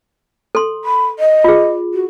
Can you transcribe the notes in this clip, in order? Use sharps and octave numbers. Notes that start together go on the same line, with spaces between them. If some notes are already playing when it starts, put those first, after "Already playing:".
A4 C6
B5
D#5
F4 G#4
F#4